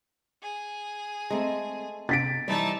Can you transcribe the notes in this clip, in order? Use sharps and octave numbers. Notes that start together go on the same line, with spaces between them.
G#4
G#3 A3 C4 A#5
C3 A6 B6 D7
E3 G3 C4 D#4 E4 D5 A5